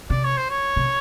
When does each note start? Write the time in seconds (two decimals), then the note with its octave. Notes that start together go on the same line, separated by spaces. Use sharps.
0.10 C3 D5
0.24 C#5
0.37 C5
0.50 C#5
0.76 C3